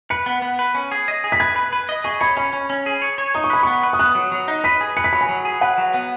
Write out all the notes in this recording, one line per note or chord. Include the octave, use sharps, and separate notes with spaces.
B4 C#7
B3
B3
B4
C#4
G#4
D#5
G#4
B6
B4 G#6
B4
B4
D#5
G#4 C#6
C#5 B5
C#4 B5
C#4
C#4
G#4
C#5
C#5
D#4 D#6
C#6
B4 B5
B3 C#6
B4
D#6
B3 F#6
F#3
F#3
D#4
B4 B6
G#4
B4 C#7
B6
F#3 B5
G#5
F#3
G#4
B4 F#5
F#3
B3